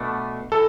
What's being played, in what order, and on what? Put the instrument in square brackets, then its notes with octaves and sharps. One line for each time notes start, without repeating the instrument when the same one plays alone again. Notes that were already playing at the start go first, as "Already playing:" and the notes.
Already playing: [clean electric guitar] B2 A3 D4
[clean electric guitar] E3 [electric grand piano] A4